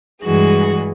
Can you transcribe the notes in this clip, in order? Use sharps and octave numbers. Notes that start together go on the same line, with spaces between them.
G2 E3 G#3 F#4 G#4